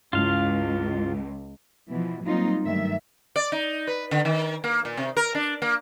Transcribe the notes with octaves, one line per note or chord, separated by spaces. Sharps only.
C#2 G2 C#4 E4 F4 F5
B2 E3 F3
F#3 G3 A#3 C4 D#4 F4
G2 D#3 F#3 G3 A3 E5
D5
D#4
B4
D3
D#3
A#3
A#2
C3
A#4
D4
A#3